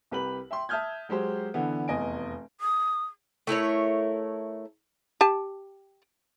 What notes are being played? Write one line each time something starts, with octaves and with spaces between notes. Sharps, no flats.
C2 G4 B4 B5 F#7
E5 G5 C6
E5 A5 D#6 F6 G6 G#6
F#3 G#3 G4 C5
D3 E3 B3
F1 E2 D#5 G#5 D7
D#6
A3 E4 A#4 C#5
G4 A5